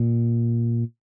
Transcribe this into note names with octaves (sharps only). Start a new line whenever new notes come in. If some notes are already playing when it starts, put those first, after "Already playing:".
Already playing: A#2